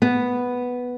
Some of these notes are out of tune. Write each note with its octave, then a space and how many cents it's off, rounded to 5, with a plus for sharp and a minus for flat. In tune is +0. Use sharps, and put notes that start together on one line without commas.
B3 +0